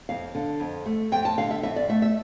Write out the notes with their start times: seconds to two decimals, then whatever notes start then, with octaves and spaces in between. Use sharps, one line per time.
0.09 F2 F5
0.35 D3
0.60 F2
0.86 A3
1.12 F2 G5
1.25 A5
1.38 D3 F5
1.51 E5
1.63 F2 E5
1.76 D5
1.89 A3 E5
2.02 E5